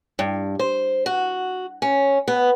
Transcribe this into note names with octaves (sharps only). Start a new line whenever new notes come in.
G2
C5
F#4
C#4
B3